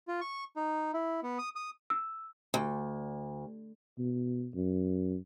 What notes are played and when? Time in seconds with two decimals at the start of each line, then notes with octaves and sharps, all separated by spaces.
0.08 F4
0.21 C#6
0.56 D#4
0.94 E4
1.23 B3
1.38 D#6
1.56 D#6
1.90 E6
2.54 D2
3.98 B2
4.55 F#2